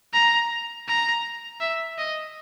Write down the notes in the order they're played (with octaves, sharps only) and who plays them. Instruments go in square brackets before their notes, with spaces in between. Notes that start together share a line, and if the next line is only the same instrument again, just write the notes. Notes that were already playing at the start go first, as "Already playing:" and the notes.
[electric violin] A#5
A#5
E5
D#5